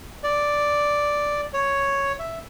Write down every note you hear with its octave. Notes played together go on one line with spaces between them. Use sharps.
D5
C#5
E5